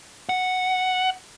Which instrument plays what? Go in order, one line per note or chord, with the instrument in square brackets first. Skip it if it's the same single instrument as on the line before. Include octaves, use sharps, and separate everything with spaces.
[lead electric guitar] F#5